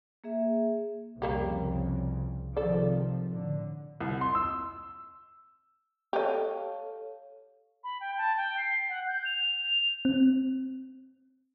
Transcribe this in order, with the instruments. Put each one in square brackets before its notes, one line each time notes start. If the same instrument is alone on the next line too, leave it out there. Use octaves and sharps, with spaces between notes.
[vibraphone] A#3 G#4 E5
[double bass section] C2 F2 C#3 [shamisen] G3 A#3 G4
[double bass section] C3 D#3 F3 [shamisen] A4 D5
[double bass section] A2 D3
[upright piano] C2
C6
E6
[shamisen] G4 D#5 [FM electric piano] A4 C#5 F5
[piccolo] B5
G5
A5
G5
C7
F#5
G6
F7
F7
[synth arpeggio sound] C4